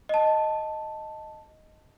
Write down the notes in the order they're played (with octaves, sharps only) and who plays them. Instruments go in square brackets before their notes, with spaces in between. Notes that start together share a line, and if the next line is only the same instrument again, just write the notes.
[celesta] D#5 A5